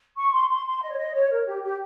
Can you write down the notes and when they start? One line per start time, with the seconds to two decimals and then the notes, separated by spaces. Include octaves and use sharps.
0.16 C#6
0.33 C6
0.49 C6
0.66 C6
0.81 D#5
0.90 C#5
0.97 D#5
1.13 C#5
1.30 A#4
1.46 G4
1.62 G4